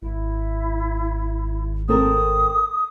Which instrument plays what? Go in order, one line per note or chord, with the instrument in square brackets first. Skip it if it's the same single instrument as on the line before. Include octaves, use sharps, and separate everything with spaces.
[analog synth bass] G#1 [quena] E4
[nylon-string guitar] C4 A4 A#4 [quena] D#6